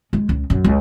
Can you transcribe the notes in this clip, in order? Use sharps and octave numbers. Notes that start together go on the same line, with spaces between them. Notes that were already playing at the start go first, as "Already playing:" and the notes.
G#3
C#2
F#2
C#2